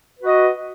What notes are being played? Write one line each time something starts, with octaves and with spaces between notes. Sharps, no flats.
F#4 B4 D#5